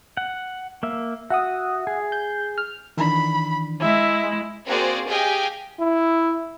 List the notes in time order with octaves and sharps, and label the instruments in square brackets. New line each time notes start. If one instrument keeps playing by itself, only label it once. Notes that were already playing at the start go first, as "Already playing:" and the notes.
[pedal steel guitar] F#5
A#3 E5
[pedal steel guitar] F#4 [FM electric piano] E5 F#5 D#6
[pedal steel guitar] G#4
[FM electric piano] G6
F6
[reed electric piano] D#3 E3 D4 [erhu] B5
[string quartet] G#3 E4 [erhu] E5
[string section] A#3 C4 F#4 G#4 C5 D5
G4 G#4 D#5 F5 G5 G#5
[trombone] E4